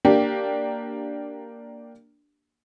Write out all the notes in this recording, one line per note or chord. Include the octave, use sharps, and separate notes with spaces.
A#3 D4 G4